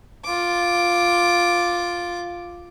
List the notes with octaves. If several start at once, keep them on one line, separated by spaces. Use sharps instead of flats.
F4 D6